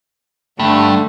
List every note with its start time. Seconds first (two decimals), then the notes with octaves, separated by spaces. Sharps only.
0.59 G2 D3 A3